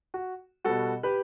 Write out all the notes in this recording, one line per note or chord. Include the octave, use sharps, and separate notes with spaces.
F#4
B2 G3 F#4 A4
G4 B4